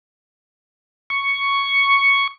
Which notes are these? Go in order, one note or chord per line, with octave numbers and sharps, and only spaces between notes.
C#6